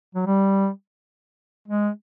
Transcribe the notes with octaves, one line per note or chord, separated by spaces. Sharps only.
F#3
G3
G#3